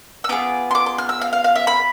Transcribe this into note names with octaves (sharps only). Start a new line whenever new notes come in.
E6
B3 F4 G#4 D6
C6
D6
C6
F6
E6
F5
F5
F5
E5
B5